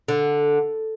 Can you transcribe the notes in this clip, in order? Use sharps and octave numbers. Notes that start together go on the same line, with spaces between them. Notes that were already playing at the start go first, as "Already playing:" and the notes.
D3